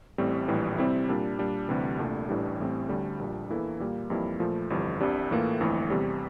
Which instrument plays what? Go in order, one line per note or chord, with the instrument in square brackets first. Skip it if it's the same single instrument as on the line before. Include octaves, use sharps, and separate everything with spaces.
[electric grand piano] A1 A2 G3 C4
A#1 A2 E3 G3
C3 G3 C4 E4
A#2 G3 D4
A#2 G3 D4
D2 C3 E3 G3
C2 A#2 A3 D4
A1 A2 E3 G3 D4
A1 A2 G3 C4
D2 D3 G3 D4
A#1 A#2 G3 D4
E2 E3 A#3 E4 A4
A#2 G3 A#3
F2 E3 G3 A#3 E4
A#2 F3 A3
G1 F2 E3 G3
C2 C3 G3 D4
A2 E3 A#3 F4 A4
G1 F2 E3 A3 E4
E2 C3 G3